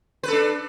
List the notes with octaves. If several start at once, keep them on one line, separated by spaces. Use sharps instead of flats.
D4 A4 B4